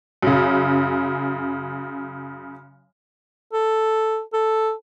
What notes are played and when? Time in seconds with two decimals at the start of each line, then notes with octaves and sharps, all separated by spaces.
0.23 F#2 C#3
3.53 A4
4.33 A4